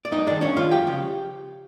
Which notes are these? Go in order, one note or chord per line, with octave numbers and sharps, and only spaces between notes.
D5
G2 D#4 D#5
D#3 G#3 D4 D5
G2 C#4 C#5
D#3 G#3 F4 F5
F#2 G4 G5
C#3 F3